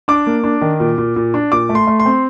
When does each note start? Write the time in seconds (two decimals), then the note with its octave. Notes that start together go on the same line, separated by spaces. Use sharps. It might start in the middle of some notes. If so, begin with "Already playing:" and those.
0.08 D4 D6
0.26 A#3
0.44 D4
0.61 D#3
0.80 A#2
0.98 A#2
1.16 A#2
1.34 D4
1.52 A#2 D6
1.69 A3
1.75 C6
1.87 A3
2.00 C6
2.06 C4